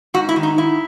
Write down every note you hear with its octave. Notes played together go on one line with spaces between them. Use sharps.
G#2 F#4
E4
D#3
D#4
D#3 E4